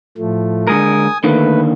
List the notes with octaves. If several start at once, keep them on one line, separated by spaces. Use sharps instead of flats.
A2 F3 A3
D3 G#3 A#4 G#5 D#6
D3 D#3 A3 A#3 B4